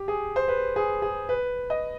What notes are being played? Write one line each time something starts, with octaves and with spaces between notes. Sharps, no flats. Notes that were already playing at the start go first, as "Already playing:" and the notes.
Already playing: G4
G#4
C5
B4
G#4
G#4
B4
D#5